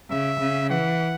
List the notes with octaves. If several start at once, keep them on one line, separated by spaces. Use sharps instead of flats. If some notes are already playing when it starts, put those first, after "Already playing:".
C#3 E5
C#3
E3 F#5